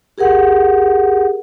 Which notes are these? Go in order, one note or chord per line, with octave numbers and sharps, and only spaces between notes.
G4 G#4 A#4 F#5